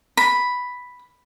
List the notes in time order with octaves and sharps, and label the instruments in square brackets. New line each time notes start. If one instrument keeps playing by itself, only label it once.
[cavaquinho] B5